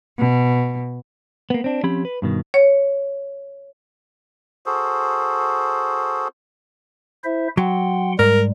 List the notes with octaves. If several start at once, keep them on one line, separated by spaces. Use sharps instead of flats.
B2
A#3 B3
C4 D4
F3 C4 C#4 G4 B5
B4
G2 B2 D#3
C#5
F#4 G#4 A4 C5
E4 C5 E5
F#3 F#5 G5 C6
G#2 G3 A#4